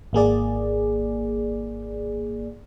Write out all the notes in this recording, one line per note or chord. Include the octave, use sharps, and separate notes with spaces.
G#1 A#3 G#4 D5